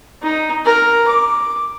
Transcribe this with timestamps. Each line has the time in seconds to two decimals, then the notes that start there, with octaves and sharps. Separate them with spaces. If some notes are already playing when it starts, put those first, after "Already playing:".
0.23 D#4
0.65 A#4
1.07 D6